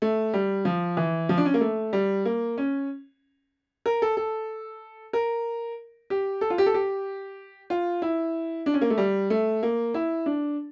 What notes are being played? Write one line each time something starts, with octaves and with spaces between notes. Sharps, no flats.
A3
G3
F3
E3
F3
D4
C#4
A#3
A3
G3
A#3
C#4
A#4
A4
A4
A#4
G4
A4
F4
G4
A4
G4
F4
E4
D4
C#4
A#3
A3
G3
A3
A#3
E4
D4